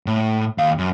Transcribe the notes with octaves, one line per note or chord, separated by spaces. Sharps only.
A2
D#2 F5
F#2